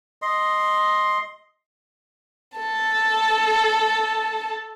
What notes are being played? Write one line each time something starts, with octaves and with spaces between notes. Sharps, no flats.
D#5 C6
A4 A5